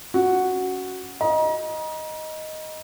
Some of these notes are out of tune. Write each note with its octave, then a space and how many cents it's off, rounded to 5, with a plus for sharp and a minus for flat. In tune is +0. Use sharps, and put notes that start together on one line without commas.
C#4 +0 F#4 +0
D#5 +0 A#5 +35